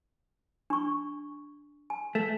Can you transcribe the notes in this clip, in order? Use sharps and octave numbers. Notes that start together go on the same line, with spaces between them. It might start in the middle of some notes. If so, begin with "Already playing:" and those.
D4 C#6
G#5
A3